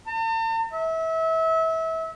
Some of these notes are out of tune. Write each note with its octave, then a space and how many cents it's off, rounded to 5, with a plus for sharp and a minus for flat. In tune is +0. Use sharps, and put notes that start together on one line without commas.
A5 +45
E5 -30